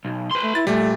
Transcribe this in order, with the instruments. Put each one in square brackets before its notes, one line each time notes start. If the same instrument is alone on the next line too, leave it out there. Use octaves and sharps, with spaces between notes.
[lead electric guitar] B1
B4 C6
[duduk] A3
[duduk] E4 [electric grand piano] A6
[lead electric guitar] A#2 [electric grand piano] G3 [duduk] A3